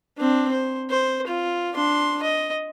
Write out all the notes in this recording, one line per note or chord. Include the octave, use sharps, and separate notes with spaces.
C4 D4
C5
C5
F4
D4 C6
D#5